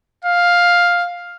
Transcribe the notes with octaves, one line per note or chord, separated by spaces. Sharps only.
F5